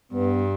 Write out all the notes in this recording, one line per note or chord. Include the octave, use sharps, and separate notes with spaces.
G2 B3